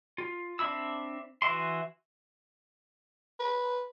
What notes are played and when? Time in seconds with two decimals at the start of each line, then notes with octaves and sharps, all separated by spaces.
0.18 F4
0.59 C4 D4 E5 B5 E6
1.42 E3 F#4 E5 C6
3.40 B4